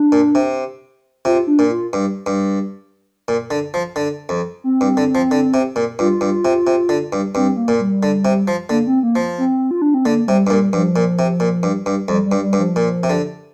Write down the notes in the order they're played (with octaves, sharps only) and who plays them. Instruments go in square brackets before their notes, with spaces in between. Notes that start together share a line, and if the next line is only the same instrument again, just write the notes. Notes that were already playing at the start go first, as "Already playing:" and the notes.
Already playing: [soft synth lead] D4
[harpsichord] A#2
C3
[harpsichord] C3 [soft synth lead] F4
[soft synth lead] D4
[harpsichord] A#2
[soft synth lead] F4
[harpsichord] G2
G2
A#2
D3
F3
D3
F2
[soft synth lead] C4
[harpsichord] G2
D3
F3
D3
C3
A#2
[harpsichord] G2 [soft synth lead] F4
[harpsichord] G2
C3
C3
D3
G2
[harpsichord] G2 [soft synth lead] C4
[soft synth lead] A#3
[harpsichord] A#2
[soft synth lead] G3
[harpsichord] D3
C3
F3
[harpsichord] D3 [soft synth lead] A#3
[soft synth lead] C4
A#3
[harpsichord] F3
[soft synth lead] C4
F4
D4
C4
[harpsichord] D3 [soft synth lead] A#3
[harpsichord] C3 [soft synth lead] G3
[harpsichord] G2
[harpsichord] A#2 [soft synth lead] G3
[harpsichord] G2 [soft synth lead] F3
[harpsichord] A#2
C3
A#2
G2
G2
[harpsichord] F2 [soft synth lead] G3
[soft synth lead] G3
[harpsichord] G2
[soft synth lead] G3
[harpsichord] G2
[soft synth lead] F3
[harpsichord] A#2
C3
D3